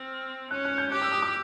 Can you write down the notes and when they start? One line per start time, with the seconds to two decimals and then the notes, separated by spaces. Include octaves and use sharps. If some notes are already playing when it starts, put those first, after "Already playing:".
Already playing: C4 F6
0.50 C#4 F#6
0.65 F#6
0.78 G6
0.91 G4 F#6
1.02 E6
1.12 D#6
1.22 D6